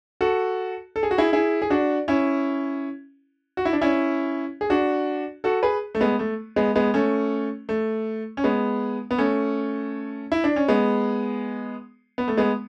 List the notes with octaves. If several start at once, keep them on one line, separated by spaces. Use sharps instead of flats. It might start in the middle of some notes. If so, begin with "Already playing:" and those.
F#4 A4
A4
G#4
F#4
E4 G#4
E4 G#4
G#4
D4 F#4
C#4 E4
F#4
E4
D4
C#4 E4
G#4
D4 F#4
F#4 A4
G#4 B4
A3
G#3 B3
A3
G#3 B3
G#3 B3
A3 C#4
A3
C#4
G#3 B3
B3
A3 C#4
E4
D4
C#4
G#3 B3
B3
A3
G#3 B3